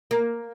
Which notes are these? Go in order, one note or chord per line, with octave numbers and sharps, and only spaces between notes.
A#3